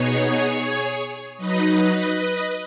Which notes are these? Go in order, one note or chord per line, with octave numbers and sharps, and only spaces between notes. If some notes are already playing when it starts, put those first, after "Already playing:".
Already playing: B2 B3 D#4 G#4 C#5
F#3 D#4 B4 D#5